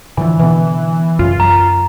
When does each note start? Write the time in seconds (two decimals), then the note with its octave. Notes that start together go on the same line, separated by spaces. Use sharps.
0.17 A2 D3 E3 F3
0.39 B2 D3 E3 B3
1.19 B1 F#2 C#3 F4
1.40 F#2 A#5